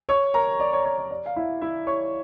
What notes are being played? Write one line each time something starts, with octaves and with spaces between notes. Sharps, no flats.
C#5 C#6
A#4 A#5
D5
C#5
C#5
C#5
D5
F5
E4 E5
E4 E5
C#5 C#6